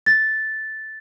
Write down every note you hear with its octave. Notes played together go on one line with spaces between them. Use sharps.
A6